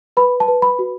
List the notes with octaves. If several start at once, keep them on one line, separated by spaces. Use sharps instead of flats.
B4 B5
A5
B4
B5
F#4